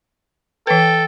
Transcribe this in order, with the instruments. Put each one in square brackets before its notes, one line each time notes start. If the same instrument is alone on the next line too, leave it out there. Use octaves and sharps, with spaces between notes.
[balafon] E3 B4 [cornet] A4 [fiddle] G5